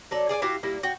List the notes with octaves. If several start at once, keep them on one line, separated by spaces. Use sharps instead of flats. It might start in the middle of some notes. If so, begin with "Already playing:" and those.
F#3 A4 D5
G#4 D5 E5 G#5
E4 F#4 G4 F5
G3 A#3 E4
F#4 G5